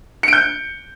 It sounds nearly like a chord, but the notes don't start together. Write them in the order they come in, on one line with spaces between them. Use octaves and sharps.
C#7 D7 G6